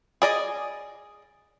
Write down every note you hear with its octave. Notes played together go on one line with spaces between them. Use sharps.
G#4 D5 D#5